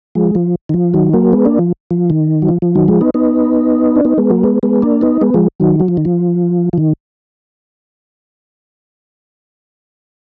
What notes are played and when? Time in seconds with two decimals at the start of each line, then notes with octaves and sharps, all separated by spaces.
0.15 F3 G#3
0.35 F3
0.69 D#3
0.74 F3
0.94 D#3 F#3
1.13 F#3 A#3
1.33 G#3 B3
1.45 A#3 D4
1.59 F3
1.91 F3
2.10 D#3
2.42 F#3
2.49 F3
2.62 F3
2.75 D#3 F#3
2.88 F3 G#3
3.01 B3 D#4
3.14 B3 D#4
3.96 D4
4.05 B3 D#4
4.18 G#3 B3
4.30 F#3 A#3
4.44 G#3 B3
4.63 G#3 B3
4.82 A#3 D4
5.01 B3 D#4
5.21 G#3 B3
5.34 F3 G#3
5.60 D#3 F#3
5.80 F#3
5.88 F3
5.97 D#3
6.05 F3
6.73 F3
6.78 D#3